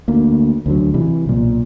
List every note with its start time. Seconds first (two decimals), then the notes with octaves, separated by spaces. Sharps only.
0.08 D2 A#3
0.66 D2 D3 F#3
0.94 C3 E3 G3
1.26 B1 A#2